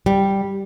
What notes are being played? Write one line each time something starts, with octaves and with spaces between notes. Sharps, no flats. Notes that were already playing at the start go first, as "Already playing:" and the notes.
G3